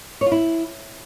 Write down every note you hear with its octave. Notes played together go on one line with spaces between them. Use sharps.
C#5
F4
E4